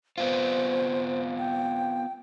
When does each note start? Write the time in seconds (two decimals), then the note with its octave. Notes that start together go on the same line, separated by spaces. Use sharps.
0.18 B3 C4 F4 C5
1.39 G5